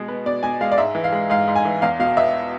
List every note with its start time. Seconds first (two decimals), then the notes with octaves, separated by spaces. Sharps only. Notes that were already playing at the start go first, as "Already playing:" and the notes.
Already playing: B2 G#3
0.08 B3
0.26 B2 D5
0.43 B2 G#5
0.61 G#3 F5
0.72 D5
0.78 G#2 E5
0.95 E3
1.04 F5
1.12 G#3
1.30 G#2 F5
1.48 G#2
1.55 G#5
1.65 E3
1.82 E2 F5
1.99 B2 F5
2.17 B3 E5